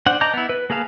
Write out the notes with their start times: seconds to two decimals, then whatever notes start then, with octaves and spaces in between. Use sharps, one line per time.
0.06 D4 C5 F#5
0.21 D#5 A5 A#5 D6 G6
0.34 B3 E4
0.49 B4
0.70 A#3 G#4 B4 F5 A5